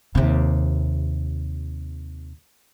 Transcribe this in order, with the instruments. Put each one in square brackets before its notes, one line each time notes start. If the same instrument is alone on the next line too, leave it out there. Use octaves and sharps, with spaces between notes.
[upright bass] D#2 C3